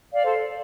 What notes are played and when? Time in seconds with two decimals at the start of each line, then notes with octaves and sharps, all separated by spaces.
0.12 D5 F5
0.23 A4 C5